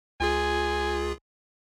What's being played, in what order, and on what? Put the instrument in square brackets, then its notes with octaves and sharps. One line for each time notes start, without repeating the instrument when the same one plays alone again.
[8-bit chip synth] C#2 F4 G#4 [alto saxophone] G#5